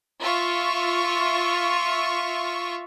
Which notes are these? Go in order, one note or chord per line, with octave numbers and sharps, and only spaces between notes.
F4 E5 C#6